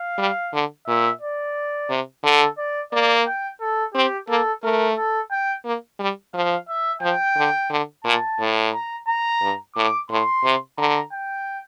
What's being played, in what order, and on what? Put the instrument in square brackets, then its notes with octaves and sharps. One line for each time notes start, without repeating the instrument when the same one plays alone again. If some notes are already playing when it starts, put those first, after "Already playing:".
Already playing: [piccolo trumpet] F5
[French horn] G3
D3
[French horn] A#2 [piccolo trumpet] E5
[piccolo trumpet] D5
[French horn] C3
[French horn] D3 [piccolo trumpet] A4
[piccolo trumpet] D5
[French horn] A#3 [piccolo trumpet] D5
[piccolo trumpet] G5
A4
[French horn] C4 [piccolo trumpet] G4
[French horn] A#3 [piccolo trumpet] A4
[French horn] A3 [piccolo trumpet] A#4
[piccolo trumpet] A4
G5
[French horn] A#3
G3
[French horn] F3 [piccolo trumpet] F5
[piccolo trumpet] E5
[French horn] F3 [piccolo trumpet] G5
[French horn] D3
D3
[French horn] A#2 [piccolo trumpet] A5
[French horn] A2
[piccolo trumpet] A#5
A#5
[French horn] G2
[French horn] A2 [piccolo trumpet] D6
[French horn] A2 [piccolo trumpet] C6
[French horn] C3
[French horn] D3 [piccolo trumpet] A#5
[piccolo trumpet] G5